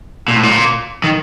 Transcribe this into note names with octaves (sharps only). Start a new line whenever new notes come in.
A#2
A2
A#2
D#3